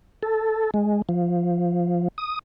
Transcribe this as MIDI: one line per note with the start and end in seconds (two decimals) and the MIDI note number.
0.23 0.71 69
0.74 1.02 56
1.09 2.08 53
2.18 2.39 87